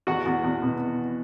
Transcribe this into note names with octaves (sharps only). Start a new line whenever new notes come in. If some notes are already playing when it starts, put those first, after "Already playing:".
E2 F#4 F#5
E2
E2
B2